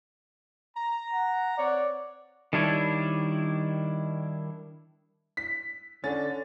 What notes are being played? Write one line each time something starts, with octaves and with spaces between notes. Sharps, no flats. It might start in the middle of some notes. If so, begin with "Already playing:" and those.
A#5
F#5
C4 C#5 D5 F#5
D#3 G3 D4 E4 C#5
B6
D3 C#4 A6